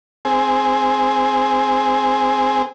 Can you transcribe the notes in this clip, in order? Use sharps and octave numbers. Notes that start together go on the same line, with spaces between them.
C4 G#4